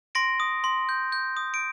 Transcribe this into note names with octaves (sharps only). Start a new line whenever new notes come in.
C6 A#6 D7
D#6
C6
G6
G6
D#6
D7